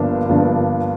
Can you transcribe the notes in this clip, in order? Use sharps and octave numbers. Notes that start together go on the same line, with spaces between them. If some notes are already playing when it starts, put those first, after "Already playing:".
Already playing: G1 G2 F3 A#3 D4
G1 G2 F3 A#3 D4